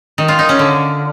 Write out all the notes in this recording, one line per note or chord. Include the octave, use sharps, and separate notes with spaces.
D#3
F4
D#4
C#4
D3